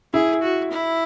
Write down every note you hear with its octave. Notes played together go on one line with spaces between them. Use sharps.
E4 G#4
F#4
E4